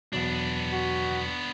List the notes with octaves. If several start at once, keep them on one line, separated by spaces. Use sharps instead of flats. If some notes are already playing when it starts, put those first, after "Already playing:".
E2 B2 F#3 B3 D4
F#4